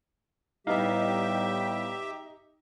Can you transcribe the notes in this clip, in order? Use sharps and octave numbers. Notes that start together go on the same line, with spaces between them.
A2 G3 B3 D#4 G4 E5 F5